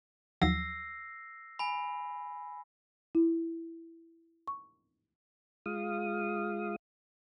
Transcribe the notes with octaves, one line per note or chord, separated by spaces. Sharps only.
D#2 F3 F#3 E6 A#6 C7
G#5 B5
E4
C#6
G#3 F4 F5 D#6